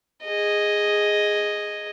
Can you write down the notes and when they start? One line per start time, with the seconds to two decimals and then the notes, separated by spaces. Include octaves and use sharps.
0.24 G#4 D#5